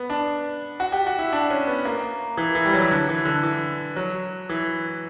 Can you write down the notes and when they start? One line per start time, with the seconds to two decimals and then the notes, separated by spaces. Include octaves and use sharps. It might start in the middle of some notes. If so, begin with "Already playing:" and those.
Already playing: B3
0.10 D4
0.80 F#4
0.92 G4
1.07 F#4
1.19 E4
1.33 D4
1.50 C#4
1.67 B3
1.85 A#3
2.37 E3
2.55 E3
2.66 G3
2.74 F#3
2.82 E3
2.91 D3
3.09 E3
3.25 D3
3.43 E3
3.96 F#3
4.49 E3